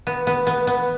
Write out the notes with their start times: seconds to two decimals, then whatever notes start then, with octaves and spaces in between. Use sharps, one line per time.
0.07 B3
0.27 B3
0.47 B3
0.67 B3